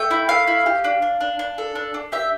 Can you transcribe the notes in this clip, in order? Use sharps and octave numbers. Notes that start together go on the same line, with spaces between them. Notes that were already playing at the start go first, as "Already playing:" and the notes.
Already playing: A3 G5
E4
A3 F5
E4
G4
D4
D4
D4
D4
A4
D4
D4
G4 E5